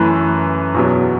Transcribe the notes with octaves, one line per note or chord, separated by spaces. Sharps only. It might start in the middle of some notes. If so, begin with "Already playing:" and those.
Already playing: F#2 E3 A3 E4 B4
E2 B2 F#3